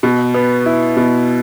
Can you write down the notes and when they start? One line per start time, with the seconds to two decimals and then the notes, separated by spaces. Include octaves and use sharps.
0.03 B2
0.34 B3
0.66 E4
0.97 B2